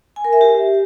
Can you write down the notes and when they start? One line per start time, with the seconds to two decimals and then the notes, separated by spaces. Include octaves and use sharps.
0.16 G#5
0.25 A#4
0.33 E5
0.41 G4